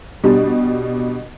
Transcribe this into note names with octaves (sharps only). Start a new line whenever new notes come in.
B2 G3 D4